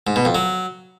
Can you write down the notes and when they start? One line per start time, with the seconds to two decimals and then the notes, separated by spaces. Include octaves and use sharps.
0.07 G#2
0.16 B2
0.25 F2
0.35 F#3